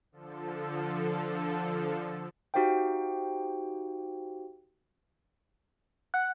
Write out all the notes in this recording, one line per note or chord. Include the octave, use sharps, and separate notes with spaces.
D3 F3 A4
D#4 F#4 G4 C5 F5 G5
F#5 F#6